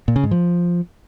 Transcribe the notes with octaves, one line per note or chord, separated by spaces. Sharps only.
A#2
C#3
G#2
F3